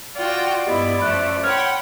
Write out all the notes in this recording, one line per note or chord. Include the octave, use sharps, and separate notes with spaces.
F4 F#4 D5 G5
G2 B3 E4 G4 D#5 B5
F#2 F3 A3 B5 F#6
C#5 F#5 G5 B5 C6 F6